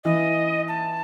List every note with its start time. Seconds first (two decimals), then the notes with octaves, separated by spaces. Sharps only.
0.04 E3 D#5
0.68 A5